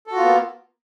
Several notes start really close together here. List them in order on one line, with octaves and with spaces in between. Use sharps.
A4 F#4 F4 B3 A#3